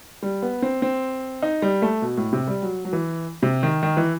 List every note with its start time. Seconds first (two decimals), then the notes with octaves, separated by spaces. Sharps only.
0.23 G3
0.42 B3
0.62 C4
0.82 C4
1.42 D#4
1.62 G3
1.82 A3
2.02 B2
2.17 A2
2.33 C3
2.47 G3
2.63 F#3
2.85 F#3
2.93 E3
3.43 C3
3.63 D#3
3.83 D#3
3.97 E3